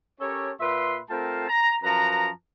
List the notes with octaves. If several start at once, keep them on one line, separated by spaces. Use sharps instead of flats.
C#4 G4 A4 A#4 C#5
A#2 B4 E5 C6
A3 C4 F4 A#4 G5 A5
A#5
F#2 F3 B4 A5 A#5